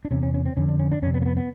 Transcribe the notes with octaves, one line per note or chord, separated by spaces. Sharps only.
D4
E2 C3 C#4
C#4
C#4
C4
F2 D3 C#4
D4
C#4
D4
F2 C3 C#4
B3
A#3
B3
B3